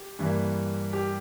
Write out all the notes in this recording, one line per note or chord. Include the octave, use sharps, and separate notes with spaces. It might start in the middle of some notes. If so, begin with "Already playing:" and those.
Already playing: G4
G2 E3 A#3
G4